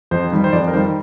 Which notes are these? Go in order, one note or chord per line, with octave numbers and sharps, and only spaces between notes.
F2 C5
D#3 G3
C5
F2 D5
A#4
D#3 G3 C5